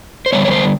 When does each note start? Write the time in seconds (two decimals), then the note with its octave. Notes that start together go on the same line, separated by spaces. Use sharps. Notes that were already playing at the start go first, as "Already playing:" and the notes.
0.26 C5
0.32 D3 G3 B3 C#5
0.45 C#5
0.51 C5